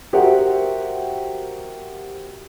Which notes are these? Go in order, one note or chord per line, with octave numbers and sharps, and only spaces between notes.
F#4 G4 A#4 C5 E5 F#5